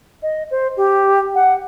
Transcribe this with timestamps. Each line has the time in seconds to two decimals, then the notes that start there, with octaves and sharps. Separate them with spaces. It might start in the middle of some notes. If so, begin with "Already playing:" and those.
0.23 D#5
0.51 C5
0.77 G4
1.35 F#5